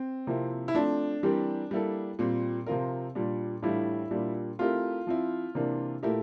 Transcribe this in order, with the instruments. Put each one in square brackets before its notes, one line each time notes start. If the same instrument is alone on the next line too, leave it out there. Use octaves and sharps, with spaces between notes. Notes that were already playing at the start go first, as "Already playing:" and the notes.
Already playing: [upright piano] C4
[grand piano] C3 F3 A#3 E4
[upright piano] E4
[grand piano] F3 A3 C4 [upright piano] D4
[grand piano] E3 G3 C4 G4 A#4
G3 A#3 E4 A4
A#2 G3 C4
C3 F3 C4 F4 A#4
A#2 G3 D4
[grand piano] A2 E3 G3 D4 F4 [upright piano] E4
[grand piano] A#2 G3 A#3 D4
[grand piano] A3 C4 E4 G4 A#4 [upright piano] F4
[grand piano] F3 C4 E4
C3 E3 A#3 D4
A#2 A3 E4 G4 A#4